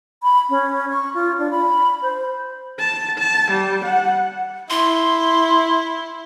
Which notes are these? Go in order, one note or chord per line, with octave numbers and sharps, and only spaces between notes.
B5
C#4
C#6
F4
D4
B5
C5
A5
A5
G3
F#5
E4 C6